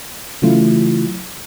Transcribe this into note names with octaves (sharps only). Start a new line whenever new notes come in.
C#3 E3 F#3 A3 E4 F4